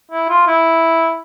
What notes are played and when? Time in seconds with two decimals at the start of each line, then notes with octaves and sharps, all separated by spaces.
0.11 E4
0.29 F4
0.47 E4